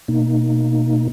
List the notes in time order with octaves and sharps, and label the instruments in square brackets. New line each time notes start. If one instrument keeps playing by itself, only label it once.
[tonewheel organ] B2 A#3 D#4